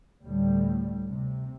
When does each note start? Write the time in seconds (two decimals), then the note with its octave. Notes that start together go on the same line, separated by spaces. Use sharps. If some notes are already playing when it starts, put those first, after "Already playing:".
0.24 D2 A2 G3
1.10 C3